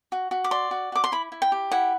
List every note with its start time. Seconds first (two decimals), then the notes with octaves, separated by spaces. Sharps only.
0.12 F#4
0.31 F#4
0.44 D6
0.51 D5 C6
0.71 F#4
0.92 F#4 D6
1.04 C6
1.12 E4 B5
1.32 E4
1.42 G5
1.52 G4
1.71 E4 F#5